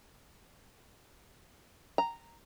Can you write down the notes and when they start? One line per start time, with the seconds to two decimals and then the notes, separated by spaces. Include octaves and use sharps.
1.98 A#5